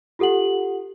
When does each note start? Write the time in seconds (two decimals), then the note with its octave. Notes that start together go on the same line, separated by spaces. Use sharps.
0.19 F4 G4 A4 F#5 F#7